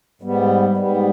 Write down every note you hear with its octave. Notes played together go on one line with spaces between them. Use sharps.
G#2 G3 B3
G#2 G3 B3